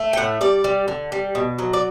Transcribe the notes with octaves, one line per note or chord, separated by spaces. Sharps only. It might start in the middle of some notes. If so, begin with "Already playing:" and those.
Already playing: A3
G5
A2 F#5
G3 D5
G3
D3
G3
B2
F#3
D5